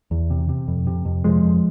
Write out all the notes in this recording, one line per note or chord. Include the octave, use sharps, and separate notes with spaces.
E2
C3
C3
F2
C3
F2
F2 F3 G#3
F2